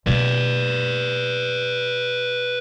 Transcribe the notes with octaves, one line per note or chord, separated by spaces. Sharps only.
B2 A#3 B4 D5